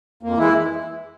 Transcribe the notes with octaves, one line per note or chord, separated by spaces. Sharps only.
F2 A#3
E3 G#3 E4